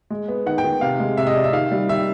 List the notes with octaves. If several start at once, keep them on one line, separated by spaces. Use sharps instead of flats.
G#3
B3
D#3 F#5
G5
D#3
C3 F5
G#3
C3 E5
D#5
C3 D5
E5
D#3 F5
G3
D#3 E5